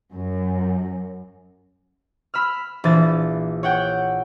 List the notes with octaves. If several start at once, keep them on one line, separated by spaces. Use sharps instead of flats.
F#2
B5 E6 F6
A#1 E3 A6
C#5 F#5 G5